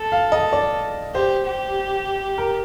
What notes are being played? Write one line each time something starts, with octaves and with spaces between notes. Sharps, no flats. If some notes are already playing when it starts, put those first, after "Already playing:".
Already playing: A4
F5
D#5
D5
G4 C5
G4
A#4